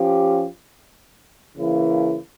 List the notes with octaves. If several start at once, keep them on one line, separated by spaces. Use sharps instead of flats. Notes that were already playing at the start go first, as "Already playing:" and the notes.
Already playing: F3 C#4 G4
C#3 E3 A#3 E4